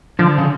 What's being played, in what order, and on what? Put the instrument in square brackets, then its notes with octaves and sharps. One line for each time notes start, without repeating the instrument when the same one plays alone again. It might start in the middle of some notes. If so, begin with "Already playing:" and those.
[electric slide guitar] D3 [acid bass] F3
[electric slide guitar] C#3